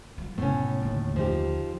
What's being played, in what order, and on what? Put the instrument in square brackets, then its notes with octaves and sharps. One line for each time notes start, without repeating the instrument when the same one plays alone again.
[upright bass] F3 F#3
[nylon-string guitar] A2 C#4 [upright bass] C3 B3
[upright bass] D#2 D3
[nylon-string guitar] F3 D#4 G4